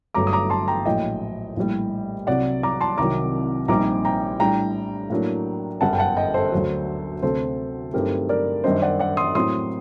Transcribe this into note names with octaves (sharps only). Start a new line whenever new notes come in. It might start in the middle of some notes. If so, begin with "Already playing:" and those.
G1 G2 F#3 A3 A#5 D6
D#6
A#5 D6
A5 C6
G5 A#5
A#1 A2 F#3 D#5 G5
A#1 A2 G3
C2 C3 F#3 D5 F#5
A#5 D6
A5 C6
C2 C3 D#3 F#3 A#5 D6
A#1 A#2 G3 C4 D#4 A#5 D6
G5 A#5
A2 G3 D4 G5 A#5
A2 F#3 A#3 D4
G1 F#2 D3 G3 F#5 A5
G5
F#5 A5
D#5 G5
A4 C5
D2 D3 F#3
D2 C3 F#3 A4 C5
G2 F#3 A3 C4 D#4 G4 A#4
A#4 D5
F#2 D#3 G3 D4 C5 D#5
D5 F#5
D5 F#5
C6 D#6
A2 F#3 C4 C6 D#6